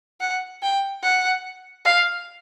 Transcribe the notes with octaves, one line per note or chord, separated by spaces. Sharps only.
F#5
G5
F#5
F5